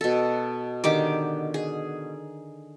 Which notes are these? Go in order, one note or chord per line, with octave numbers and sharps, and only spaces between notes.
B2 A4
D3 D#3 G4 D6
G#4